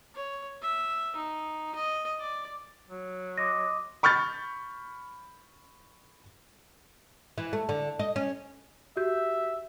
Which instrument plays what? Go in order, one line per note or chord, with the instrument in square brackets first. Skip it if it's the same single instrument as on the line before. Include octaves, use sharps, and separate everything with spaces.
[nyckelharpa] C#5
E5
D#4
D#5
D5
[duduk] F#3
[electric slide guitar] D#5 [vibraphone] C6 D6 [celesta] A#6
[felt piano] B5 C#6 F6 G6 A6
[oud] E3
A3
D3
D#5
C#4
[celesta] F#4 G4 G6 [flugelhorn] E5